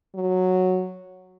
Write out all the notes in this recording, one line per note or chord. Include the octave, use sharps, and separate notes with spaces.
F#3